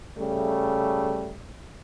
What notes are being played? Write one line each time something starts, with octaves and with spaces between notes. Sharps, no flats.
C#3 G3 A3